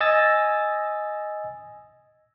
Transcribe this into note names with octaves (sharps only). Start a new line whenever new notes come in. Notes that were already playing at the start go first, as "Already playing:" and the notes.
D#5 G#5 E6 A6 A#6